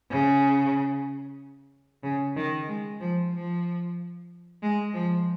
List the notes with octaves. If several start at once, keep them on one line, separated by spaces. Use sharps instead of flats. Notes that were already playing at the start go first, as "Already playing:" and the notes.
C#3
C#3
D#3
G#3
F3
F3
G#3
F3